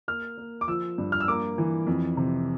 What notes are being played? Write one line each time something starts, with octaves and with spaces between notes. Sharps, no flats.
A#3 F6
A#3
D6
F3 E6
G2
F6
E6
A#3 D6
E3
F2
C3